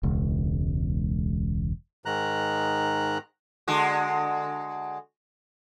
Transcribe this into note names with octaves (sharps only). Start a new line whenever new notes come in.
E1 C#2
G#2 D#3 A#5 F#6
D3 G#3 F#4